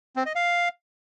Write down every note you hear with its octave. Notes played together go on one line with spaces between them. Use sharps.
C4
D#5
F5